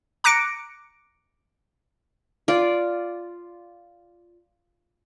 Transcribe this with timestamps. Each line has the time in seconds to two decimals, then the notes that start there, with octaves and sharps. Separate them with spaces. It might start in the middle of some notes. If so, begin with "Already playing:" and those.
0.24 A#5 D6 F#6 A#6 C#7 D7
2.48 F4 D5